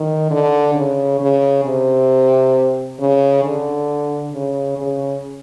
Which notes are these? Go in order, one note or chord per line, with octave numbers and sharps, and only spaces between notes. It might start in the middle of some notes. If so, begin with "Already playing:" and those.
Already playing: D#3
D3
C#3
C#3
C3
C#3
D3
C#3
C#3